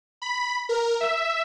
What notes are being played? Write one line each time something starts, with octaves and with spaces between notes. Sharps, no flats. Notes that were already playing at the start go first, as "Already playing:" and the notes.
B5
A#4
E5